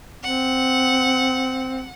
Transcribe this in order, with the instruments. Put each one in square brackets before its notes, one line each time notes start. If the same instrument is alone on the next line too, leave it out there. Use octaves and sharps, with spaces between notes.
[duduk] C4 [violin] F#5